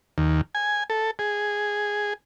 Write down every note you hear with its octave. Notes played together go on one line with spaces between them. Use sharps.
D#2
G#5
A4
G#4